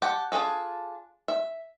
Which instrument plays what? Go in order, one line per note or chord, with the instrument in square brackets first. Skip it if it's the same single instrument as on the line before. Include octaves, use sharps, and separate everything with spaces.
[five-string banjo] G4 F#5 G5 A5
D4 F4 G#4 A4
E5